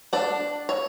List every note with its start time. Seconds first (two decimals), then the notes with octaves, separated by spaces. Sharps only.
0.13 D4 F#5
0.69 C#5